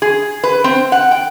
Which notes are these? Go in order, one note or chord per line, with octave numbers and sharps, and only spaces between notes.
G#4
B4
C4
F#5
G5